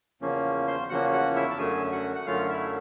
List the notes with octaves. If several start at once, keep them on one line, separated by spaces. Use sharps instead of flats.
E2 C#3 F3 A#3 C#4
C5 C6
E2 C#3 F3 A#3 C#4 F#4 F#5
F#4 F#5
E4 E5
A5
F#2 D3 F#3 A3 C#4 G#4 G#5
F#4 F#5
F#5
F#2 D3 F#3 A3 C#4 F4 F5
E4 E5